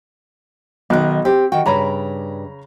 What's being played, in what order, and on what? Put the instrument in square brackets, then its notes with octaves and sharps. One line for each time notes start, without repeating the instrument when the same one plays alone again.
[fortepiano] B1 F#6 [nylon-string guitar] D#3 D#4
[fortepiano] C4 [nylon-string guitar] G4
[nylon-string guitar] D#3 G5 [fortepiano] F#4
[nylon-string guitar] G2 C#5 D5 [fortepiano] C#3 A#5 B5